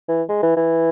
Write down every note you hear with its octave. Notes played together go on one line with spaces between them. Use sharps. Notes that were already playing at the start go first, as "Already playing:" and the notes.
E3
G#3
E3
E3